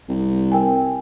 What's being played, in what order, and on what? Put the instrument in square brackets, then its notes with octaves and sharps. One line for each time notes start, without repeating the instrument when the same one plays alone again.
[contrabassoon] C2
[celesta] A#4 G5 G#5